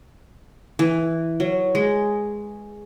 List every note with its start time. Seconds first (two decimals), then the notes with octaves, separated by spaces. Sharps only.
0.79 E3
1.40 F#3
1.75 G#3